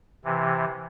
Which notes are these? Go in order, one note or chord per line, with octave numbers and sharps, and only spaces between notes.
C3 E3